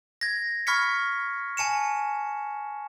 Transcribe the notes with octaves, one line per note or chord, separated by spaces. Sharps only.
G#6 A#6
B5 C#6 F6 G#6 B6 C#7
G#5 A5 C#7 E7